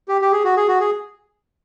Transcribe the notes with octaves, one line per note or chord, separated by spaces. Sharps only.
G4
G4
G#4
F#4
G#4
F#4
G#4